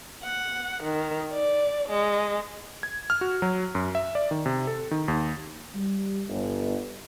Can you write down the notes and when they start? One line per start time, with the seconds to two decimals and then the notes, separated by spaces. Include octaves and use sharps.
0.23 F#5
0.83 D#3
1.33 D5
1.90 G#3
2.83 G#6
3.10 F6
3.21 F#4
3.42 F#3
3.75 F#2
3.95 E5
4.15 D5
4.31 D#3
4.46 C3
4.67 A4
4.91 D#3
5.08 D#2
5.75 G3
6.29 G1